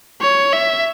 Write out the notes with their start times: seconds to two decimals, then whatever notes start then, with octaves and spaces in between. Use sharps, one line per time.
0.21 C#5
0.53 E5